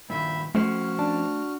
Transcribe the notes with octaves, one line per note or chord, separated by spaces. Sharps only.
G2 A#2 D#3 E5 B5
F2 A3 C#4 F#4 C5 F6
D4 D5 A5